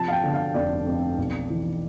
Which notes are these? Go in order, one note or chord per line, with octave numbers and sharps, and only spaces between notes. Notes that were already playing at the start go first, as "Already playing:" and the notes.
Already playing: C3 F3 A5
F5
G5
D3
F5
F1 D5
F2
B1
E3